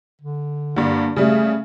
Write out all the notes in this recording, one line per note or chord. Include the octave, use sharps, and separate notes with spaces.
D3
G2 D3 A#3
C#3 G3 A3